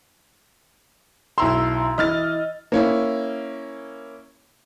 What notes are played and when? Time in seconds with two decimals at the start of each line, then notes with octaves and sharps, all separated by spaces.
1.38 B1 E4 A#5 C6 E6
1.98 E3 D#5 F6 A6
2.72 A#3 C#4 E4